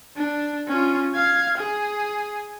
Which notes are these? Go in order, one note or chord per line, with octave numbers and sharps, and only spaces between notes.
D4
C#4 F4
F5 G#6
G#4